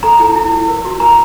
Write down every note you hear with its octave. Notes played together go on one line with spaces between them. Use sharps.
A4 A#5
E4
E4
E4
A#4
F#4
A#4 A#5